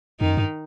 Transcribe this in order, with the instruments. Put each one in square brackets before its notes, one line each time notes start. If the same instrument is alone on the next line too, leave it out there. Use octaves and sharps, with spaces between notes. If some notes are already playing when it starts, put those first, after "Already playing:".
[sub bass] F2 [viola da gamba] D#3 D#4
[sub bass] F#2
G2